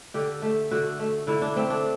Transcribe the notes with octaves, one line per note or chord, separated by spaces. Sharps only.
D3 G4
A3
D3 F#4
A3
D3 E4
D4
A3 C4
D4